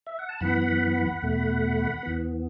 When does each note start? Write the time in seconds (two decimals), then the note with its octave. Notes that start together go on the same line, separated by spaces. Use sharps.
0.07 E5
0.19 F#5
0.29 A5
0.40 F#2 E3 B3 F#5 B5
1.22 E2 B2 A3
2.03 E2 E3 B3